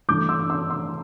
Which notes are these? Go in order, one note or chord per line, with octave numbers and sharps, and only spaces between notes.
G2 E3 A3 D6 G6
C6 E6
C6 E6
C6 E6